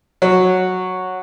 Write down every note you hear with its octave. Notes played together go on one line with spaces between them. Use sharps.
F#3